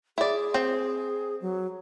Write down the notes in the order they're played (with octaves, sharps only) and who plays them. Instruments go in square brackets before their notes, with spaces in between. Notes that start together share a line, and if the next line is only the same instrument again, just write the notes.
[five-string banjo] E4 D5 [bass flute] G#4
[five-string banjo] C4
[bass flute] F#3